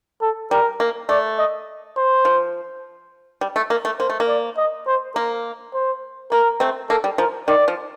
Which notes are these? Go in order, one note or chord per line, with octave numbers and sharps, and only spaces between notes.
A4
G3 A#4
A#3
A3 D5
D#5
C5
F3
G3
A3
A#3
A3
A#3 C5
A3
A#3
D5
D#5
C5
A#3 A#4
C5
A#3 A#4
A3 C4
A#3 A4
G3
F3 A#4
D#3 D5
F3